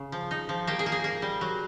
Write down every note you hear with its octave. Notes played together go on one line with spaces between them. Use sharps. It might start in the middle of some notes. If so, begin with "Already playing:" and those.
Already playing: C#3
F3
D#4
F3
A#3 G4
G#4
A#3
G#4
A#3
G3
F#3